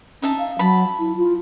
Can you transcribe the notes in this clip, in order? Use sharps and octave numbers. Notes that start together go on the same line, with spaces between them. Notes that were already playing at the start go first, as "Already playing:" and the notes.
C#4 D#4 E5 A5
F5
F#3 A5 B5
E4
F4